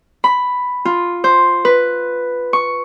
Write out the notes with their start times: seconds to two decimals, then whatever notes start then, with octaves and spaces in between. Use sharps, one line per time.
0.24 B5
0.85 F4
1.24 C5
1.65 B4
2.53 C#6